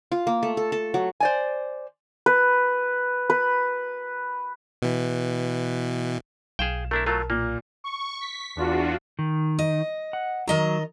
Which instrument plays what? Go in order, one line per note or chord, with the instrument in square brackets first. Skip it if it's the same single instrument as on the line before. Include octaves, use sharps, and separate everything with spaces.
[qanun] F4
A#3
A3
A4
A4
F#3
[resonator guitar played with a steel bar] C5 D5 G#5
[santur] B4
B4
[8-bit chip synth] B2 E3
[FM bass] B1 [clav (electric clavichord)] G#4 G5 [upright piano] F5 E7
[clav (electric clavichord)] A3 D4 E4 [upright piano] A#4
[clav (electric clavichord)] F#3 A3 F4 [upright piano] A#4 A5
[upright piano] A#2 [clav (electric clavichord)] A#3
[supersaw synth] C#6
B6
E2 D4 F4 F#4
[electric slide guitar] D#3
[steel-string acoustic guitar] D#5
[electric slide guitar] F#5
[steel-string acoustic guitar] D#3 D#5 A#5 [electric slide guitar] F#3